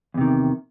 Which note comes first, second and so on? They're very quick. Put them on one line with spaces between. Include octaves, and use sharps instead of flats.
E2 C3 D#3